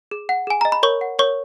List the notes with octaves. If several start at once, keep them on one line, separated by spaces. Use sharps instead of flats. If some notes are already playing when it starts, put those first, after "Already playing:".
G#4
F#5
G#4 G#5
D#5 A#5
B5
A#4 C#5 C#6
F#5
A#4 C#5 C#6